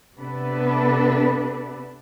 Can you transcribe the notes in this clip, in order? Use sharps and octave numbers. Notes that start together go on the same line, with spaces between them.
C3 B3 D4 A4 B4